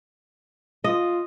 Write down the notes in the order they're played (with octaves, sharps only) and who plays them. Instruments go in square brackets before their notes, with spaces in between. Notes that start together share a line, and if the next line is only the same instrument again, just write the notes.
[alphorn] F4 [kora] D#5